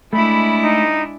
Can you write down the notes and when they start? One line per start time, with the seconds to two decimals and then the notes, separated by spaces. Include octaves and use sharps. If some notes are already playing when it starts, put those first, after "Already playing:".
0.13 G#3 A3 D4 E4 B5
0.62 D#4